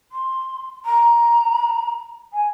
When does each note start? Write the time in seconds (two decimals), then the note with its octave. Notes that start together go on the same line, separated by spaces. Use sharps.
0.11 C6
0.85 A#5
2.33 G#5